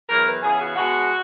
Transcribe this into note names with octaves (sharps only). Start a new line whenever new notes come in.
E2 D#3 F#3 A#4
B4
C#3 E3 B3 G#4
F#4
B2 G#3 B3 F#4